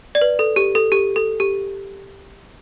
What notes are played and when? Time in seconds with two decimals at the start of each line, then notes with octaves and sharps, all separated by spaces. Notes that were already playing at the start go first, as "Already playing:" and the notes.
0.15 D5
0.21 B4
0.39 A4
0.56 G4
0.75 A4
0.92 G4
1.16 A4
1.40 G4